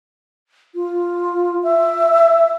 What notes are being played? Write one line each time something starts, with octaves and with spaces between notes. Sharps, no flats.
F4
E5